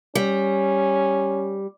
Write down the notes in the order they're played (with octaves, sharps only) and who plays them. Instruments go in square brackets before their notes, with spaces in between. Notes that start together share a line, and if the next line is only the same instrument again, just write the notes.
[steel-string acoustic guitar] G3 [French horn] C#4